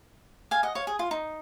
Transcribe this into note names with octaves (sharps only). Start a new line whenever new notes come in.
F5 G#5
D#5 F#5
C#5 F5
G#4
F4
D#4